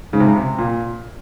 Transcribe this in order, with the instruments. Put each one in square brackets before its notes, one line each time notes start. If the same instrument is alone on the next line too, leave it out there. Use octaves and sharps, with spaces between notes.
[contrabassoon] G#2 [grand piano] C#3
[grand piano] C3
C#3
C3
A#2